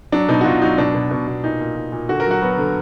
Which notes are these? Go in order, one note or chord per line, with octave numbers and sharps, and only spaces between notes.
F#3 D4
B2 D#4
F#4
B2 F4
F#3 D#4
B2 D4
B2
B2
B2
A#2 D#4
A#2
A#2
A#2
D3 F#4
A#4
F#3
F#4
F#3 B3
D3